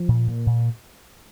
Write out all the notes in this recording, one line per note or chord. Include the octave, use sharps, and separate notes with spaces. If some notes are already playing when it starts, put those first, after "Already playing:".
Already playing: F3
A#2
A#2
A#2